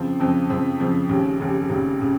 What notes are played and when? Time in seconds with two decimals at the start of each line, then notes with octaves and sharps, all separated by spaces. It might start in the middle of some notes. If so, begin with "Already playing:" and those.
Already playing: F2 C#3 F3 C4
0.20 F2 C#3 F3 C4
0.50 F2 C#3 F3 C4
0.79 F2 C#3 F3 C4
1.09 F1 D#2 C#3
1.40 F1 D#2 C#3
1.69 F1 D#2 C#3
2.01 C#3